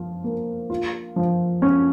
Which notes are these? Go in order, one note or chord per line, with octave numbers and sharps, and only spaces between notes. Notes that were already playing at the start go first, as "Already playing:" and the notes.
Already playing: F3 F4
A#3
F4
F3
C#4